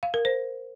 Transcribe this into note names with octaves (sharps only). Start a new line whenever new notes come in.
F5
A#4
C5